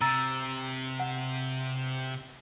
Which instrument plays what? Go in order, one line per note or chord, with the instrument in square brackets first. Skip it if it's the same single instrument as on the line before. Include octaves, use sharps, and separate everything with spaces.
[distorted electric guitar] C3 [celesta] A#5 E6 A6
[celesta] F#5